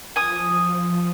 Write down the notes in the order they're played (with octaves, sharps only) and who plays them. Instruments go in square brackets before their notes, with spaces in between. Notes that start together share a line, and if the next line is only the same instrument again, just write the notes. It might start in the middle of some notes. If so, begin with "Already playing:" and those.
[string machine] F3 [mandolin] G#5 D#6